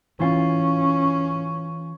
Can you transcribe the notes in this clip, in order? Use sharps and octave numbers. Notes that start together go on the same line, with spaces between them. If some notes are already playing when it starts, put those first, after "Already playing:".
E3 C#4 F4